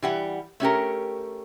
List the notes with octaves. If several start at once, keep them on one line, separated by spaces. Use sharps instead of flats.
E3 G3 F#5
A3 C#4 G4 A#4